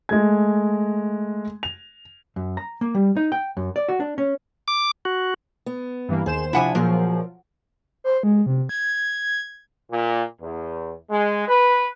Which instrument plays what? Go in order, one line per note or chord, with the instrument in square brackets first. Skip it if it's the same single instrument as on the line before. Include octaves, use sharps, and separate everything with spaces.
[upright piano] G#3 A3 G#6
F7
[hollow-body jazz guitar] F#2
A#5
A#3
G3
D#4
G5
F#2
D5
F#4
D4
C#4
[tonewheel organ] D6
F#4
[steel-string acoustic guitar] B3
[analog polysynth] G2 E3 A#3
[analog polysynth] D#2 C5 E7 [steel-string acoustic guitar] G#4
[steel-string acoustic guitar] C3 F3 E5 [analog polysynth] D4 [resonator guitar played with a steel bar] E4 F#5 G#5
[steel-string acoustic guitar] A#2 G#4 [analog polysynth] F3 F#3 [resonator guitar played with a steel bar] A#4
[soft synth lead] C5
G#3
C3
G#6
[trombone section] A#2
E2
G#3
B4